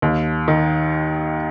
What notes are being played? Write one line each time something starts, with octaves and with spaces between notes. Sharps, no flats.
D#2
D#3